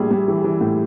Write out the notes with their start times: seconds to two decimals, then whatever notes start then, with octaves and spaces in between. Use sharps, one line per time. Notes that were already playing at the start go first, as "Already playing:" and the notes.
Already playing: A#1 A2 G3 G#4
0.11 G3
0.28 E3
0.44 E3
0.61 A2